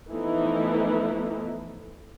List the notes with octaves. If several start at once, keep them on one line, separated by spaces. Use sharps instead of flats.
E3 F3 A3 B3 D#4 E4